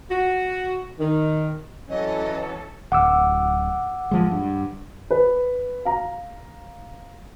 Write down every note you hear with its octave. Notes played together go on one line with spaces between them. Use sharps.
F#4
D#3
E3 F#3 C#4 A4 D#5
D1 F#5 D6 E6
A1 F3 G#3
G2
B4
F5 A#5